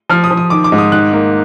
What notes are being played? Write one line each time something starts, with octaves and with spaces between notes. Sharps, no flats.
F3 F6
D#6
F3
D#6
D#3 D6
D6
G#2
D#6
D#3 F#6
A#3